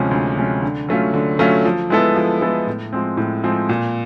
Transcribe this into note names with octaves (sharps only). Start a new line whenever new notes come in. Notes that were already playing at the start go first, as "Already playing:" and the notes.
Already playing: D2 C3 F3 G#3 C#4
D2
C3 F3 G#3 C#4
D3
F#3 A3 C#4 F4
D3
F#3 A3 C#4 F4
F3
G#3 B3 E4 A4
F3
G#3 B3 E4 A4
A2
F3 G#3 C4
A2
F3 G#3 C4
A#2